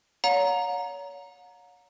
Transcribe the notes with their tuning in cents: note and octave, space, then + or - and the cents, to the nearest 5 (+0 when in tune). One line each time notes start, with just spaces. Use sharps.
C#5 +35 F#5 -45 A#5 +0